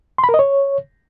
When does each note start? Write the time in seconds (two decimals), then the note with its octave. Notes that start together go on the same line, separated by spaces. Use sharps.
0.18 C6
0.24 B5
0.29 A#4
0.34 D#5
0.39 C#5